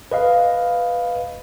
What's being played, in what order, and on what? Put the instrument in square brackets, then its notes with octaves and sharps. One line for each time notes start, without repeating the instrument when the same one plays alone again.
[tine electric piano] B4 D#5 F5